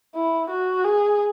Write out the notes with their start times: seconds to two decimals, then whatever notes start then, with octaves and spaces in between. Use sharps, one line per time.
0.15 E4
0.50 F#4
0.84 G#4